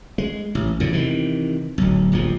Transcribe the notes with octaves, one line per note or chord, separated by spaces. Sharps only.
G#3
A1
E2 G#2 C#3
C3 D#3 E3
D1 B1
D1 A#1 D#2 F3